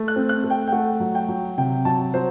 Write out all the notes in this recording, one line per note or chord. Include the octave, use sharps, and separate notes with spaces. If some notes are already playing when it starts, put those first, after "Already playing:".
Already playing: A3
F#6
C4
F#6
A3
G5
G5
A3 F#5
F#3
G5
F#3
C3 G5
F#3 A5
F#3 C5